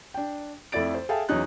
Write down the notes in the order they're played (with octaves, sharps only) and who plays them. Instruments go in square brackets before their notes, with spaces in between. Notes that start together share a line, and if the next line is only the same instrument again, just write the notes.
[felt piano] D4 G5
F2 A3 E4 D5 A6 D7
C5
G#4 A4 E5 F5 G5 A5
E2 F#3 C#4 D#4 F#6